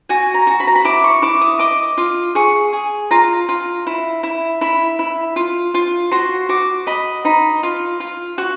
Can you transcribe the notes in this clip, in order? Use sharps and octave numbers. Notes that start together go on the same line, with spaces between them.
F#4 G#5
A#5
F#4
B5
A#5
B5
E4 D6
C#6
E4 D6
D#6
D#5 D6
F4
G#4 C#6
G#4
F4 A#5
F4
E4
E4
E4 B5
E4
F4
F4
F#4 C6
F#4 D6
D#5 B5
D#4 B5
F4
F4
F#4